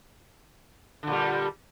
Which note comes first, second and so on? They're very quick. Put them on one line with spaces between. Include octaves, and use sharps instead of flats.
D3 A#2 G3